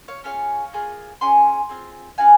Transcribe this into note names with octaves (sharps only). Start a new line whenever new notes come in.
C#5 F5
C#4 F4 G#4 C#5 F5
A#3 F4 G#4
C#4 G#4 G#5 C6
C4 F4 G#4
C#4 F#4 F5 G#5